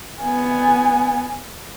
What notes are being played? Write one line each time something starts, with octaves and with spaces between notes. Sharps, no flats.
B3 G#5